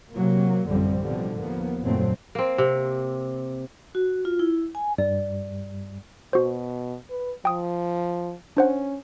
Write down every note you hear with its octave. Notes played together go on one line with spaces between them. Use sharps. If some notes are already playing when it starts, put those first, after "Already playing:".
C3 F#3 A#3
A1 F#2 D3 F3 G3 C4
B2 D3 F3 G3
D#2 F3 A#3 B3
F#1 D#2 A#2 F#3 A3 C4
A#3 C4
C3
F#4
F4
E4
G#5
G2 G3 D5
B2 F#4 C5
B4
F3 G5 D#6
C#4 D4 C5 F#5